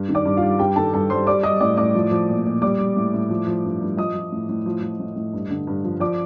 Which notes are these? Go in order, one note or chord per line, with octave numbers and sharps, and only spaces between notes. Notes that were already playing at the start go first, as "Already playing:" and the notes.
Already playing: G2
D#3
D5 D6
G2
F4 F5
G3
G2 G4 G5
D#3 A4 A5
G2 A4 A5
G3 C5 C6
G3 D5 D6
G3 D#5 D#6
A2 D5 D6
A2 D5 D6
F3
F3
A#2
A#2
G3 D5 D6
G3
A2
A2
F3
F3
G2
G2
F3 D#5 D#6
F3
A2
A2
F3
F3
A2
A2
G2
D3
G2
F3
F3 D5 D6